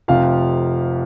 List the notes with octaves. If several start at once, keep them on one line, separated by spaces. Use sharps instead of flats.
F1 F2 C3 F3 F5